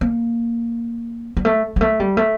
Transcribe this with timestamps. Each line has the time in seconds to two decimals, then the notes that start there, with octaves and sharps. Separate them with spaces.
0.01 A#3
1.37 G3
1.45 A3
1.76 G3
1.81 A3
2.00 G3
2.17 A3